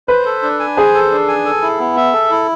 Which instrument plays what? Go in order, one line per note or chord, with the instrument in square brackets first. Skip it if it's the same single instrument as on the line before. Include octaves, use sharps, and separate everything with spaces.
[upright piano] B4 [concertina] C5
[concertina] A4
D4
G#5
[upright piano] G#4 [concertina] C5
[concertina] A4
D4
G#5
A4
E4
B3
E5
A4
E4